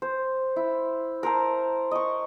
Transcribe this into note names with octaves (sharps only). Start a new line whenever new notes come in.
C5
E4
A#4 C5 A5
D#5 C#6